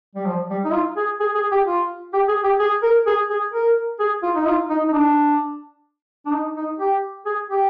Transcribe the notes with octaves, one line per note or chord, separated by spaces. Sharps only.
G3
F3
G3
D#4
F4
G#4
G#4
G#4
G4
F4
G4
G#4
G4
G#4
A#4
G#4
G#4
A#4
G#4
F4
D#4
F4
D#4
D#4
D4
D4
D#4
D#4
G4
G#4
G4